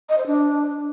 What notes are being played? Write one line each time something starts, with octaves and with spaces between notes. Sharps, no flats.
D#5
C5
D4